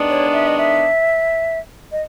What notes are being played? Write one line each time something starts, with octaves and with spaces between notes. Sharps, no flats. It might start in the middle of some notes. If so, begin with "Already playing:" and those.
Already playing: D#3 G#3 B3 D4
C#5
E5
D#5
E5
D#5